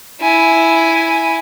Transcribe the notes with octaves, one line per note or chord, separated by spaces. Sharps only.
E4 G#5